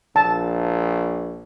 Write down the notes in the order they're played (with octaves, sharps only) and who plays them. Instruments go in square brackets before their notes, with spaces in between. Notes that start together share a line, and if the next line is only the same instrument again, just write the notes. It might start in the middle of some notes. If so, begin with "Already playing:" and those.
[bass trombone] A#1 [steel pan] A5